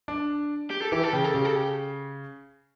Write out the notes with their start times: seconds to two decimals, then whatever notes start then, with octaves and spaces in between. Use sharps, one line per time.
0.08 D4
0.70 G4
0.82 A4
0.92 E3 G4
1.03 A4
1.13 C#3 G4
1.25 A4
1.34 C#3 G4
1.45 A4
1.56 G4